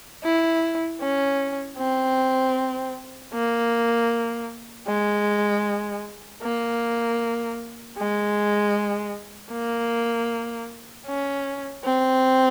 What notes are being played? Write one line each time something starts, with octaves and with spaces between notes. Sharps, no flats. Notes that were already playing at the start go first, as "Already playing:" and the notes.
E4
C#4
C4
A#3
G#3
A#3
G#3
A#3
C#4
C4